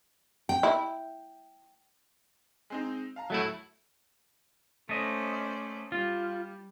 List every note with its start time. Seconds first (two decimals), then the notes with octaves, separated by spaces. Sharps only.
0.49 G5
0.63 E4
2.70 G#3 C4 D#4
3.16 F5 A5 A#5
3.30 E1 F#3 A3 E4 A4 E5
4.89 A3 C#4 C5 D5 D#5
5.92 G3 F4